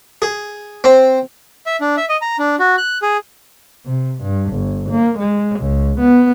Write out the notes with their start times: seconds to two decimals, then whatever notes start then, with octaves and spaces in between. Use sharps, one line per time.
0.22 G#4
0.84 C4
1.66 E5
1.81 D4
1.97 E5
2.09 D#5
2.21 A#5
2.39 D4
2.59 F#4
2.78 F#6
3.02 G#4
3.86 C3
4.22 G2
4.53 G1
4.90 A#3
5.19 G#3
5.60 C#2
6.00 B3